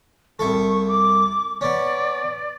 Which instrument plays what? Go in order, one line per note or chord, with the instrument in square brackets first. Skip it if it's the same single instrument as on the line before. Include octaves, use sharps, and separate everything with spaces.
[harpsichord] C2 E4 A4 [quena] C#6
[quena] D6
[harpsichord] B3 C#4 [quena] D5